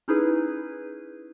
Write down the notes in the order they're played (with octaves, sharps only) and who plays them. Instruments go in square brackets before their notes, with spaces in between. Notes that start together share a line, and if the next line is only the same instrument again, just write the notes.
[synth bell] C#4 D#4 E4 G#4 B4